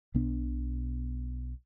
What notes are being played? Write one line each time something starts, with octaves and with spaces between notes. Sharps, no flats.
B1 B2 B3 D4